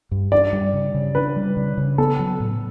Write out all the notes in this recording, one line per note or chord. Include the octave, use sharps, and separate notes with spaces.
G2
D4 D5
G3
C#3
C#3
D4 B4
G3
C#3
C#3
B3 A4
F#3
A2